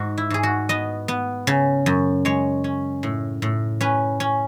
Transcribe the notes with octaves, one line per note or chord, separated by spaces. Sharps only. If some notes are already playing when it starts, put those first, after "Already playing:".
Already playing: G#2 F#4
E4
G#2 G#4
F#4
B3 D#5
B3
C#3
F#2
G#3 C#5
C#4
A2
A2
C#4 B4
C#4